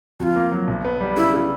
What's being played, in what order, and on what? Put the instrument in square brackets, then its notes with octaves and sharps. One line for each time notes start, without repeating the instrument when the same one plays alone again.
[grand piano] F2 [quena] F#4
[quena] F4
[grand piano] A#3
F#3
B1
B3
G3
[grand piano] C#3 [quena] E4
[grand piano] C#3